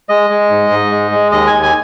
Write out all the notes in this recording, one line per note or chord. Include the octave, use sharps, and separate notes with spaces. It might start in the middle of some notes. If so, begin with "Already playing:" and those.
G#3 D#5
G#3
G#2
G#2
G#3
G#3
D#2 D#5
G#5
D#2
G#5